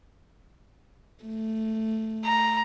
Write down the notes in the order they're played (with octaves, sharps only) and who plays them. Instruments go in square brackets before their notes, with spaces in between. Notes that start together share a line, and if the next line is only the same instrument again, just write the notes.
[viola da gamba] A3
[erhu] A#5